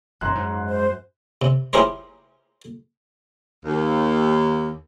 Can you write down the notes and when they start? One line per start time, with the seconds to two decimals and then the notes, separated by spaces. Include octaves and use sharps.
0.21 E1 F#2 A#5 C6 F#6
0.35 G#2
0.69 C5
1.42 C3
1.73 E4 G4 G#4 A#4 C5 C#5
3.65 D#2